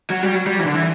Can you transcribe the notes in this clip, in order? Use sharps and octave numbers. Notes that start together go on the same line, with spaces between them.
F#3
G3
F#3
G3
E3
D3
E3